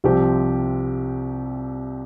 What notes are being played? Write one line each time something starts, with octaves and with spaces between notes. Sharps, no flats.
C2 C3 F3 C4 G4